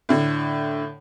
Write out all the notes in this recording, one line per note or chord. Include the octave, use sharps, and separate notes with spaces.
A2 D3